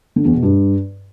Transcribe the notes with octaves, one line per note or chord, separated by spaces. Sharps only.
D3
E2
B2
G2